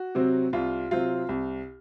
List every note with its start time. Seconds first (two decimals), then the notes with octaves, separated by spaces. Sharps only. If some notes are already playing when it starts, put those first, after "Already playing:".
Already playing: F#4
0.15 C3 F#3 C4
0.53 C2 F4
0.91 C3 F#3 C4 F4
1.29 C2